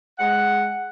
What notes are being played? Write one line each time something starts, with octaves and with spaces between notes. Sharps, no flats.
G#3 F#5